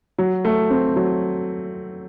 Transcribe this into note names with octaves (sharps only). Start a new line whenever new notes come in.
F#3
A3
C4
F#3